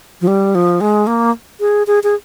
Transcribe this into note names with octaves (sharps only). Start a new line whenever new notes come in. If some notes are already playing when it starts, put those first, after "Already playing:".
F3
G3
F3
G#3
A#3
G#4
G#4
G#4